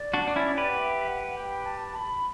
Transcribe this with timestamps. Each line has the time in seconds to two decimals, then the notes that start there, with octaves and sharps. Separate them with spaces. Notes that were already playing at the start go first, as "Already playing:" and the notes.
Already playing: D5
0.14 D4 F#4
0.28 D4
0.36 C#4 E4
0.57 G4 B4
0.70 F#5
0.79 E5
1.08 F#5
1.37 G5
1.66 A5
1.95 B5